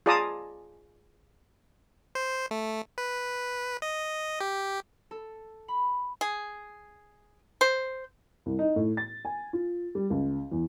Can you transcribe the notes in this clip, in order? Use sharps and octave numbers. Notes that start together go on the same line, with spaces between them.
F4 G#4 D5 A5 A#5 D#6
C5
A3
B4
D#5
G4
A4
B5
G#4
C5
C2
D#4
A2
A6
G#5
F4
G3
C#2
E2